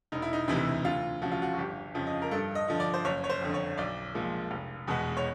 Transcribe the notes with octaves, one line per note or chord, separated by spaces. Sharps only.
E1 D#4
E4
D#4
D2 C3 E3 E4
D2 F4
C#3 F3 F#4
F4
F#4
F#4
G1 G4
F2 C#3 F3
D#5
A#4
G2 A4
D#5
D3 F3
D5
C5
F#1 C#5
C#5
C5
F2 D3
C#5
B1 D5
A#2 F3 G#3
F1
E2 B2 G#3 B3
C#5